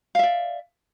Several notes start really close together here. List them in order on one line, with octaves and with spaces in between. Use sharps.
F5 E5 D5